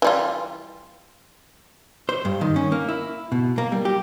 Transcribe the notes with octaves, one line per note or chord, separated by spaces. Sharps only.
E3 G3 F4
C5
G2
D#3
C#4
A#3
E4
B2
A#3
G3
G4